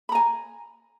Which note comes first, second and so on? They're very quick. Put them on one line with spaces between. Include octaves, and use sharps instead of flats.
B5 A#5 G#5